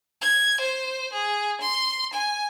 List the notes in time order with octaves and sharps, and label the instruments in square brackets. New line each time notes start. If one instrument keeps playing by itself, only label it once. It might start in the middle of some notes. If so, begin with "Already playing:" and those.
[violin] G#6
C5
G#4
C6
G#5